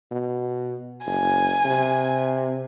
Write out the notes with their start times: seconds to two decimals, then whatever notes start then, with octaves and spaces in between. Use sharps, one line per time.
0.11 B2
1.06 F#1 G#5
1.65 C3